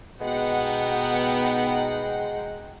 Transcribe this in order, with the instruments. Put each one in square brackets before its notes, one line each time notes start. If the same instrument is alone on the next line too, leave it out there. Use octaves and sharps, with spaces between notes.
[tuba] B2 [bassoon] G#3 [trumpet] B3 [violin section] D#4 F#5 G5